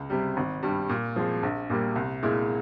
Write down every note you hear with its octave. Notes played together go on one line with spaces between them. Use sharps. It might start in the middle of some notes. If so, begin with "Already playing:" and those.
Already playing: C#2
C3 G3
G#1
G2 G3
A#2
F3 G#3 C4
A#1
A#2 G3 A#3
C2
A#2 G#3 E4